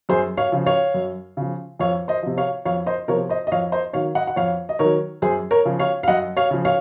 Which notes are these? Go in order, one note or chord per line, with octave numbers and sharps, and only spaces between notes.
F#2 G#4 C5
C#5 F5
C#3 F3
C#5 F5
F#2
C#3 F3
F2 C#5 F5
C5 D#5
C3 F3
C#5 F5
F2 C#5 F5
C5 D#5
C3 F3 A#4 C#5
C5 D#5
D#5
F2 C#5 F5
C5 D#5
D#3 F#3 C#5 F5
D#5 F#5
F#5
F2 C#5 F5
D#5
D#3 F#3 A#4 C#5
F#2 G#4 C5
A#4 C#5
C#3 F3
C#5 F5
F5
F#2 D#5 F#5
C#5 F5
C#3 F3
C#5 F5